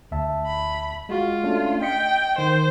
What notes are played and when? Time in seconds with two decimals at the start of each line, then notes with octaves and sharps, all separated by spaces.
0.12 D2 E5 A5
0.46 B5
1.09 G#3 F4 F#4
1.44 A3 C#4 D4
1.82 D#5 G5 B6 C#7
2.38 D#3 C5